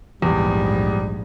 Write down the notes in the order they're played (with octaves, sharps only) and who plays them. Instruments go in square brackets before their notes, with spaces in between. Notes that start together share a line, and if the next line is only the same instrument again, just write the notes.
[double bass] A#1 G#2 [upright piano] E2 [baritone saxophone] G3